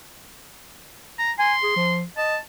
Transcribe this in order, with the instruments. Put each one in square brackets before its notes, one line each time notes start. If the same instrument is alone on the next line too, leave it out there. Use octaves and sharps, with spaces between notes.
[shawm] A#5
[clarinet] G#5 [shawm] C6
[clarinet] G#4
F3
[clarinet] D#5 [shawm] A5